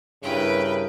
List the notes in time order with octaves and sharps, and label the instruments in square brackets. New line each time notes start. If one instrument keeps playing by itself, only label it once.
[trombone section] G2 [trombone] C#3 [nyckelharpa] E4 A#4 [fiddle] B4 G5